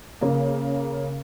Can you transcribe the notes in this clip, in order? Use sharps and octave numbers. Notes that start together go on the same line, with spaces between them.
C#3 A#3